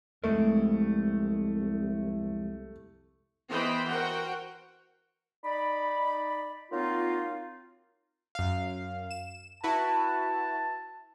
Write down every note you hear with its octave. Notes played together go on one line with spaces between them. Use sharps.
C2 F2 G#3 A3 A#4
E3 B3 C5 D#5 G5 B5
F#4 A#4 C5 F#5 G5
D#4 D5 B5
F#3 A#3 C4 D#4 F4
F#2 F5
E7
E4 F#4 B4 A5